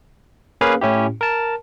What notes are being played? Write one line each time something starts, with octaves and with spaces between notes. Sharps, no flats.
A#3 C#4 G#4 B4 F5
A2 C#4 E4 G4
A#4 A5